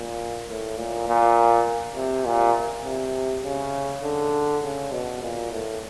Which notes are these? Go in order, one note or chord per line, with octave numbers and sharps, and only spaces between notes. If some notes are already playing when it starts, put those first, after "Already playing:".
Already playing: A#2
A2
A#2
A#2
C3
A#2
C3
C#3
D3
C#3
B2
A#2
A2